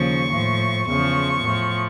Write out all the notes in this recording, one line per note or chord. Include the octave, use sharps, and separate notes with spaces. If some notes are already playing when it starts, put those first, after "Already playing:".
Already playing: D#2 C#3 F3 C#6
A2 F3
E2 C#3 F3 C#6
A2 F3